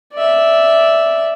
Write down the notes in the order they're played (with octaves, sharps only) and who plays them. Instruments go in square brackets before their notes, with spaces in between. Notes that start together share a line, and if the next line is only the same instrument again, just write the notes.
[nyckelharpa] D5 E5